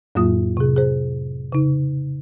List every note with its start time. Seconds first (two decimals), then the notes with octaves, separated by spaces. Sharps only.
0.15 F2 A2 F#3 A#3 F4 D#6
0.57 C3 G#4
0.76 G#4 C5
1.52 C#3 D#4